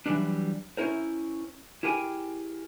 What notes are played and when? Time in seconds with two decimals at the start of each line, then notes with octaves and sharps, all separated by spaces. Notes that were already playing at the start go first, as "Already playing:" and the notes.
0.06 E3 F#3 G3 D4
0.77 C#4 E4 A#4 C5
1.83 E4 G4 G#4 A#4 G5 G#5